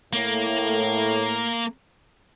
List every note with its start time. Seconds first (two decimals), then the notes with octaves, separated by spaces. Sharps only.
0.13 A2 A#3